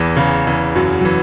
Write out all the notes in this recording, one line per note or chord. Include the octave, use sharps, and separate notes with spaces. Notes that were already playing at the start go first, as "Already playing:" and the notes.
Already playing: E2 E3
C#3
E2 E3
F#2 F#3
F#3
E3